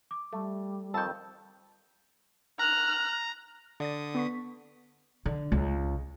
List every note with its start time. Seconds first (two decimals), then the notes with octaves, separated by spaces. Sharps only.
0.11 D6
0.33 G3 A3
0.94 F2 D#3 A5 E6 G6
2.59 A#5 F6 F#6
3.80 D3 D5 D#6 A6
4.15 B3 C#6 B6
5.26 D3
5.52 C#2